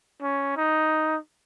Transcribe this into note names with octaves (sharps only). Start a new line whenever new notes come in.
C#4
D#4